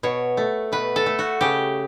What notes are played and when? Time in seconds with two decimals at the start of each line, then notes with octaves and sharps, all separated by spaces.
0.03 B2 C#5
0.37 A3
0.72 B2 B4
0.96 A4
1.06 A3
1.19 F#4
1.41 C#3 G4